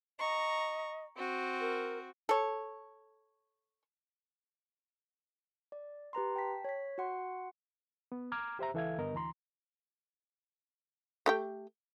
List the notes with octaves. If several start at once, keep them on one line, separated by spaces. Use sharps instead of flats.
D#5 A#5 C#6
C4 F#4
A#4
A4 C#5
D5
G4 B4 A#5 C6
G5 A5 B6
C#5 B6
F#4 F#5 C6
B3
A#5 D6 F6 G#6
G4 C5 E5 A#5
C#2 E3 A4 E5 F5 G#6
G2 D3 B3 A#4 D#5
D2 E3 A#5 C6
A3 G4 G5